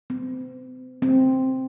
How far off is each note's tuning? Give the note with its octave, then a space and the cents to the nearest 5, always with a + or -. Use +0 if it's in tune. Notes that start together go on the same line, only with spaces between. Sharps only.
C4 -40
C4 +0